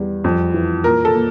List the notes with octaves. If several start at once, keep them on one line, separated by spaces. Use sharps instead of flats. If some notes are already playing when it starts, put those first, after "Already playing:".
Already playing: E2 G3
F2
E3
A#2 A#4
A4
A#3